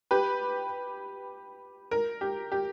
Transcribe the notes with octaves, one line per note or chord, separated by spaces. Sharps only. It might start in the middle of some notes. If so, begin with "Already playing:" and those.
G4 B4
A#4
G4
G4